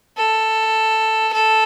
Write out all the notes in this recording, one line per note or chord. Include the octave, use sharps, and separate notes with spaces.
A4
A4